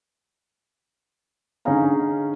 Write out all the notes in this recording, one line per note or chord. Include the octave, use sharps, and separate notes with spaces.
D3 C#4 D#4 G#4 F5 A#5